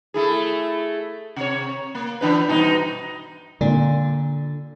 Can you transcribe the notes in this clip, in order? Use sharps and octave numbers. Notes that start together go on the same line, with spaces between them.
A3 E4 G#4
C3 C#5
A#3
E3 D4 B4
G2 B2 D#4
A#2 D3